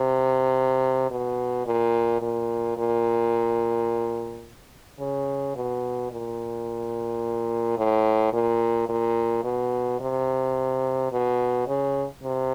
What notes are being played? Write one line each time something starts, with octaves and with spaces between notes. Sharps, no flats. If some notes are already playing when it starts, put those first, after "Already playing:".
Already playing: C3
B2
A#2
A#2
A#2
C#3
B2
A#2
A2
A#2
A#2
B2
C3
B2
C#3
C3